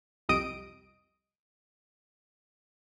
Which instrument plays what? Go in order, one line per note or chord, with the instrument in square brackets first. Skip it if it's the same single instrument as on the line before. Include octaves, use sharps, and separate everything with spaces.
[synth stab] C2 F2 G3 D#5 D#6 D7